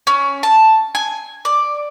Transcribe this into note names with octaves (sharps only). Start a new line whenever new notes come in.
C#4
A5
G#5
D5